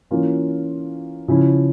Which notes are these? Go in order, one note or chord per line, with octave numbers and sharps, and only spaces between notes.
E3 A#3 C#4 F4
C#3 F3 C#4 E4